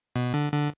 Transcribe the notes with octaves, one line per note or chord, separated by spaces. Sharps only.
B2
D3
D3